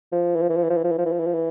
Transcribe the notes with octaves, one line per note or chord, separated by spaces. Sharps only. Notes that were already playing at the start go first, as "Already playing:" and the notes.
F3
E3
F3
E3
F3
E3
F3
E3
F3
E3
F3
E3
F3
E3
F3
E3